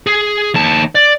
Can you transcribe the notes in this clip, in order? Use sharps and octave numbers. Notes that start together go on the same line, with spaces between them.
G#4
D#2 A5
D5